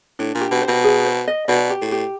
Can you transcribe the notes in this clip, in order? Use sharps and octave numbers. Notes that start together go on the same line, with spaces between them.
A2 D4
A#2
G4
B2
C5
B2
G#4
C5
D#5
B2 D5
G4
A2
G4